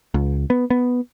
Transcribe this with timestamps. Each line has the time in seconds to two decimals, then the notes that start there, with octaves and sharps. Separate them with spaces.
0.14 C#2
0.50 B3
0.70 B3